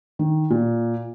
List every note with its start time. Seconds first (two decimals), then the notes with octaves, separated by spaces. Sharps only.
0.19 D#3
0.50 A#2